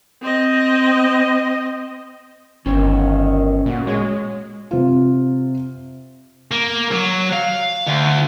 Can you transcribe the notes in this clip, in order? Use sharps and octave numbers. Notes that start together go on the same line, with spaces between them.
C4 D#5
G1 D#3 C#4 C5 C#5
A#2 F#4
G#3 C#5
C3 F4
A#3
F#3
F5
D2